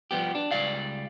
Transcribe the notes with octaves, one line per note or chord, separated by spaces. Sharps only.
F3 G3 B3 G4
D4
C#2 G3 D5 F5